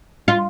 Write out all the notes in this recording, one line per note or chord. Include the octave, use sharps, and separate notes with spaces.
F4